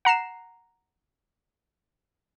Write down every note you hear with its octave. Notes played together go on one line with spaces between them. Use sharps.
F#5 A#5 C7 E7